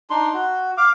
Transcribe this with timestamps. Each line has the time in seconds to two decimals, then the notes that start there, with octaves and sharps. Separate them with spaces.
0.10 D4 D#4 C6
0.34 F#4
0.77 F5 D6